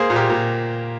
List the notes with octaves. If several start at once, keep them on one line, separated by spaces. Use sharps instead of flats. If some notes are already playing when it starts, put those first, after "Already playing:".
Already playing: A#3 G#4 C5
A#2
G4 A#4
A#2